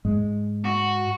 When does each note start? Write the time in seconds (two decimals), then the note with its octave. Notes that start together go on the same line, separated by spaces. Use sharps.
0.05 G#2 G#3
0.65 F#4